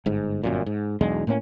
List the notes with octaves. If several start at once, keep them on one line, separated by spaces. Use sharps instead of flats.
G1 G#2
G1 F#2 A#2
G#2
B1 E2 G#3 D4
A2 A#3 C#4